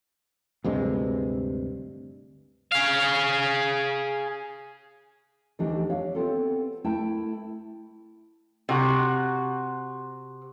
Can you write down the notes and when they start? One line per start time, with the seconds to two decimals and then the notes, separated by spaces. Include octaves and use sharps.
0.64 D2 G2 C3 G#3
2.72 G#4 F5
5.59 D2 E3 D4 D#4 G4 A#4
5.90 C#5 E5 F5
6.15 B3 C4 F4 A4
6.84 A3 E4 A#4 E5 G5 A5
8.69 C3 F#4